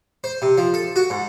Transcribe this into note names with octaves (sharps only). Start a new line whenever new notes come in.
C5
C3
F3
A4
F#4
G#2